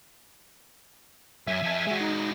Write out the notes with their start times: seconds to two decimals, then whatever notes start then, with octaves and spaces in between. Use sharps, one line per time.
1.47 F#2 E5 G#5
1.62 F3 A4
1.87 G#3 F#4
2.00 D#4